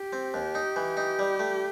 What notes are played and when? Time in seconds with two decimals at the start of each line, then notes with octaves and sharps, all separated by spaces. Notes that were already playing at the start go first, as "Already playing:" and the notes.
Already playing: G4
0.13 C4
0.34 D#2
0.55 D#4
0.76 E3
0.97 D#4
1.19 G3
1.39 A3